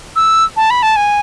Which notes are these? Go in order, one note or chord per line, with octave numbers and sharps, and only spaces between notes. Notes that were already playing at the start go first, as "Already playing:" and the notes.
E6
A5
B5
A5
G#5